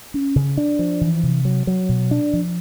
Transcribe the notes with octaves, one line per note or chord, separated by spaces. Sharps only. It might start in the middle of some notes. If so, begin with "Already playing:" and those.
C#4
C#3
D4
F3
E3
C3
F#3
F#3
B2
D4
F3